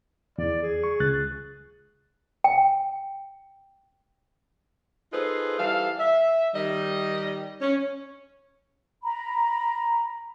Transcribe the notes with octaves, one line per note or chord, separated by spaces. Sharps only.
E2 D5
G#4
C#6
C#2 F#6 A6
G5
D#4 F4 G#4 A4 B4 C5
E3 G3 A4 F5
E5
D#3 G3 D#5
C#4
A#5 B5